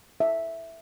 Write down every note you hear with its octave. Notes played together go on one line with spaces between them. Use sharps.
E5